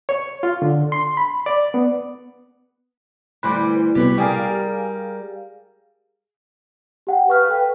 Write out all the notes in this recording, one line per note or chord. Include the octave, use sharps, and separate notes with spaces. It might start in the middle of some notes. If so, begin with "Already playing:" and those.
C#5
F4
D3
C6
B5
D5
B3
D2 E3 G3 B4 C5 D6
C2 B2 G4 B4 C#5
G3 G4 G#4 A#4 F5
G4 F#5 G5
B4 F5 C#6 F6
A4 G5